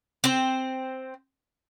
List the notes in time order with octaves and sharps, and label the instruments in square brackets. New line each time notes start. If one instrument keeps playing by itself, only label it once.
[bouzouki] C4 C5